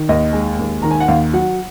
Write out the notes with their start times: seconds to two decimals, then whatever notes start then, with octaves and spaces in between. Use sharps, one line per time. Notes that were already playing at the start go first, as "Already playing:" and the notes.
Already playing: D#3
0.09 D#2 D#5
0.33 G#3
0.59 D#2
0.82 D#3 A#5
0.91 G#5
1.00 F#5
1.08 D#2 F5
1.33 F#3 F#5